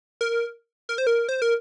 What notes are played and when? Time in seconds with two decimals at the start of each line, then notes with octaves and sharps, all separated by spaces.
0.21 A#4
0.89 A#4
0.98 C5
1.07 A#4
1.29 C5
1.42 A#4